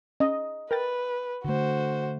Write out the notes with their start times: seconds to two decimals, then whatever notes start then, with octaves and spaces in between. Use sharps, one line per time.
0.20 C#4 D#5
0.71 A#4 B4 G5 A6
1.45 D3 A3 F#4 C5